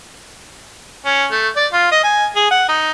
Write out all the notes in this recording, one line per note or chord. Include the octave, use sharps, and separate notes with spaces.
C#4
A3
D5
F4
D#5
G#5
G#4
F#5
D#4